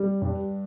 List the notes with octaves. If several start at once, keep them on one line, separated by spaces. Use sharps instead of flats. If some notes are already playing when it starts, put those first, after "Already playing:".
Already playing: G3
G2